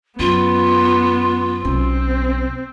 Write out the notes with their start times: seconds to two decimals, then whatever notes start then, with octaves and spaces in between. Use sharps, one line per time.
0.19 F#2 B3 F4
1.65 B1 C4 C#4